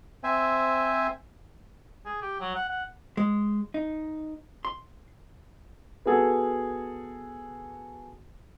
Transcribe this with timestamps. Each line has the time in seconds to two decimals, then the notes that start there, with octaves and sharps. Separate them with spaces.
0.24 C4 C5 E5 G#5
2.05 G#4
2.22 G4
2.41 F#3
2.56 F#5
2.69 F#5
3.17 G#3
3.74 D#4
4.65 C6
6.06 B3 F#4 G#4 A4